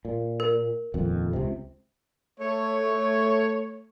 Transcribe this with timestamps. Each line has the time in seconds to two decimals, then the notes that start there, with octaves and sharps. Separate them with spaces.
0.05 A#2
0.40 A#4
0.94 D#1 F2
1.33 C#2 C3
2.40 A3 C#5